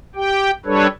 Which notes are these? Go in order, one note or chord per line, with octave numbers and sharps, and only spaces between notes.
G4 G5
G3 D4 A4 B4 C#5